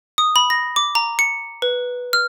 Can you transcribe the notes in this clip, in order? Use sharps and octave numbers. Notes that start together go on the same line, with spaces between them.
D#6
B5
A#6
D6
A#5
C#7
B4
F6